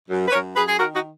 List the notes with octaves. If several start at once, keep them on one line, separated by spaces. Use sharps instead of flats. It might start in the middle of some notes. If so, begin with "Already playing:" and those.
F#2
B4
F#2 A#4 C#5
F#2 G#4 B4
G#4
D#3 F#4 A#4
D#4 F#4